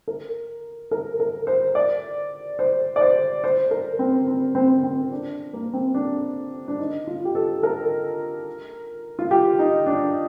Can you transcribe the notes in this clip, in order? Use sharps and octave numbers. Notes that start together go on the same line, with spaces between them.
A#4
A#4
A#4
C5
D5
C5
D5
C5
C5
A#4
C4
C4
C4
C4
D4
A#3
C4
D4
D4
D#4
F4
G4
A4
A#4
F4
G4
D#4
D4